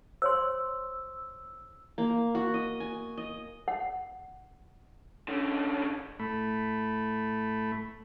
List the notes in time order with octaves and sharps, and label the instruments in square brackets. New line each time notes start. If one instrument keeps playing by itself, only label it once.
[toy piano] C5 C#5 C6 [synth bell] E6
[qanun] A#3
F#4
D#5
G#5
D#5
[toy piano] F#5
[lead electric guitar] D3 C#4
[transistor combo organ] A2 A3 B5